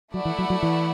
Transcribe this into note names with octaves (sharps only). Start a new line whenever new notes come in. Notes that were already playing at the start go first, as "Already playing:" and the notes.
F#3 A3 E4 D5 F#5
E3
F#3
F#3
E3